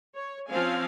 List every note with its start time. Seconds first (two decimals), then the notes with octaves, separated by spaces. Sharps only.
0.14 C#5
0.48 F3 C4 C#4 F5 G#5